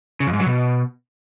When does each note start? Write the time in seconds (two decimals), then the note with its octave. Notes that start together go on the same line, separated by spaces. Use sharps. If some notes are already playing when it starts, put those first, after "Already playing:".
0.20 C#3
0.27 F2
0.33 G#2
0.40 F#3
0.46 B2